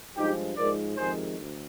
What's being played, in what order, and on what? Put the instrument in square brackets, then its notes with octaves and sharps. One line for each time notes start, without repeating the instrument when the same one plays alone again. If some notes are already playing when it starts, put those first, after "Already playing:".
[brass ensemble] G2 F3 G#3 D#4 G4
G#2 F3 G#3 A#4 D5
F2 C3 D#3 G#3 G#4 C5
D2